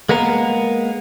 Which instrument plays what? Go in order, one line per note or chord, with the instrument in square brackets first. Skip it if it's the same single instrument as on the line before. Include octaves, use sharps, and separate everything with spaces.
[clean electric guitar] G#3 A#3 B3 A#4